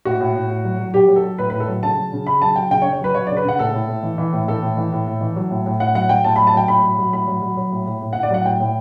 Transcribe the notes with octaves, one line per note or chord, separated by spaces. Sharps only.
A2 F#4
A2
A2
A2
F#3
F#3
F#3 G4
F#3
A4
F#3
A2 B4
A2 B4
A4
F#3
C#3 A5
F#3
C#3
C#3 B5
F#3 A5
F#3 G5
C#3 G5
C#5
C#3
C#5
F#3 B4
F#3 C#5
C#3 D5
B4
C#3 F#5
A2 A4
A2
A2
E3
E3
A2
E3 A4
A2
E3
A2
A2
E3
F#3
A2
A2
A2 F#5
F#3 F#5
F#3 G5
A2 A5
F#3 B5
A5
F#3 G5
A2 B5
F#3
F#3
A2 B5
F#3
F#3
F#3
A2
A2
A2
A2 F#5
D5
F#3 F#5
A2 G5
A2